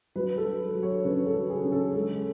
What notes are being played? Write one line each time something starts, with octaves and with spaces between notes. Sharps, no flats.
F#3 B4
A4
F#3
F#3
C#5
C#3 B4
A4
F#3
G#4
C#3
A4
G#3 A4